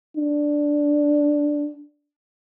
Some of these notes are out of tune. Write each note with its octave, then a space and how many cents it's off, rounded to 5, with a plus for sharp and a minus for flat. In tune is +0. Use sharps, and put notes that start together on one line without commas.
D4 +0